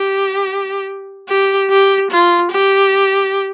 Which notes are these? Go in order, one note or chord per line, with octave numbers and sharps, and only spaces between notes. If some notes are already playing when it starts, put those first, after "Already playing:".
Already playing: G4
G4
G4
F4
G4